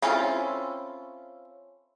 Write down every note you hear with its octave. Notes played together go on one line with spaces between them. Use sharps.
C4 C#4 E4 F4 A4